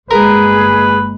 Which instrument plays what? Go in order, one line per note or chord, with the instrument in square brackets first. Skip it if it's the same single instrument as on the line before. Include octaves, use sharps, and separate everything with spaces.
[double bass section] G1 G#3 A#3 [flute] G#4 [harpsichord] A#4 [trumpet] B4